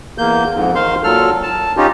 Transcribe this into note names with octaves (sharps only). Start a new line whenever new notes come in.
E2 A#3 G6
F2 G#2
D#3 C5 F5 C6
A#2 F#3 A4 F6
A5
C#4 D#4 F4 G4